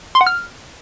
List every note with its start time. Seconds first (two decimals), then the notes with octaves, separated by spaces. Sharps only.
0.15 C6
0.21 F#5
0.27 F6